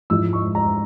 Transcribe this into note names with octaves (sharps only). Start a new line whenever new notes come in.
G#2 F3 G#3 E4 E6
C#6
A#5